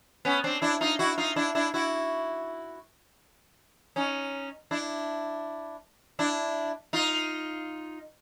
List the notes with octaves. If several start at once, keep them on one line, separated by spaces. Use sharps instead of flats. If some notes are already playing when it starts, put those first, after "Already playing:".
B3 C#4
C4 D4
D4 E4
D#4 F4
E4 F#4
D#4 F4
D4 E4
D4 E4
E4 F#4
C#4 D#4
D4 E4
D4 E4
D#4 F4